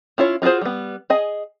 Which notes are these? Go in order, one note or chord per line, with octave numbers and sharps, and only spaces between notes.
C#4 E4 F4 C#5
D#4 F4 F#4 G#4 C5
G3 B3
G#4 D#5 G#5